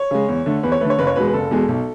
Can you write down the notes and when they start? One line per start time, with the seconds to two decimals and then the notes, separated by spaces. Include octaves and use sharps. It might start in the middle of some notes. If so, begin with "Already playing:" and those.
Already playing: C#5
0.11 C#3 G#3
0.28 E2
0.46 D3 A3
0.63 E2 B4
0.72 C#5
0.81 D3 A3 B4
0.90 C#5
0.98 F#1 B4
1.07 C#5
1.16 E2 B2 G#3 B4
1.28 B4
1.33 F#1 A4
1.51 E2 B2 G#3
1.68 B1